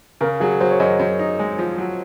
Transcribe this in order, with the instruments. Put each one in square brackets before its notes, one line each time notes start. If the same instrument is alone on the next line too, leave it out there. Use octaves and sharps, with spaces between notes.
[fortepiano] C#3 [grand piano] A#4
[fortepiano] F#3 [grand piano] G#4
[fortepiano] F#3 [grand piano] C5
[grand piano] C#5
[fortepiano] F#2 [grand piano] D#5
[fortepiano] F#2
D#4
G#3
F3
F#3